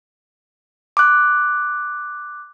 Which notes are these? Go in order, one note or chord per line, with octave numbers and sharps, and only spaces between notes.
D6 F#6